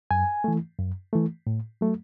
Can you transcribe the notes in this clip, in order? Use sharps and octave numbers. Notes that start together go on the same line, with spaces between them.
F#2 G#5
E3 A3
F#2
E3 A3
A2
F#3 A3